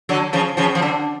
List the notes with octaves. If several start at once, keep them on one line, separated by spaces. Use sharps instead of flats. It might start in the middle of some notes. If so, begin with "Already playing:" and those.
D3 F#3
C#3 F3
C#3 F3
F3
D3